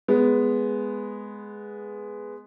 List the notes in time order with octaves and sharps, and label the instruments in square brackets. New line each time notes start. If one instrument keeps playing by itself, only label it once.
[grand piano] G#3 B3